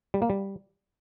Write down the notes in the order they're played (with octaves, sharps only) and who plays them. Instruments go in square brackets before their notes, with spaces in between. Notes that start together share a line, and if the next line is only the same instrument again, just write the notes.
[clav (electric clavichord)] G3
A#3
G3